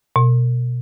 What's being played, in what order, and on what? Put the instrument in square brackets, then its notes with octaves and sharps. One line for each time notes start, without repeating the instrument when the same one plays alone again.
[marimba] B2